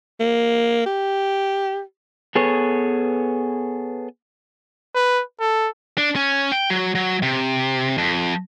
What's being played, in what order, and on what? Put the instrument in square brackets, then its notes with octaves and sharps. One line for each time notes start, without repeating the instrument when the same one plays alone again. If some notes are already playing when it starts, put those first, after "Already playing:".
[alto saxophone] A#3
G4
[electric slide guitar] B3 G#4 A4 B4 C#5
[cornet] B4
A4
[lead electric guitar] D4
C#4
G5
F#3
F#3
C3
F2